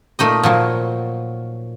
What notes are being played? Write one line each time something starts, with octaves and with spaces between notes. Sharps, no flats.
A#2 A3 D#4 D#5
A#2 F3 F#3